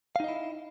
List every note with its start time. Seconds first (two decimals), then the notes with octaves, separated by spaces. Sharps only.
0.16 F5
0.20 D#4
0.24 D#5
0.28 E4